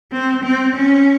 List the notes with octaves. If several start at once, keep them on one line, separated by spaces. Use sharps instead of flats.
C4
C4
C#4